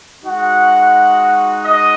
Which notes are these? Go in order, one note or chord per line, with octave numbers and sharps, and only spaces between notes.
G#3 D#4 F#4 F#5
D#5